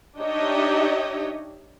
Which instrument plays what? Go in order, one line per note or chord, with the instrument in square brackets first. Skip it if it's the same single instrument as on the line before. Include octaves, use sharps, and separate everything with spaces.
[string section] D4 D#4 G4 C#5 D#5 E5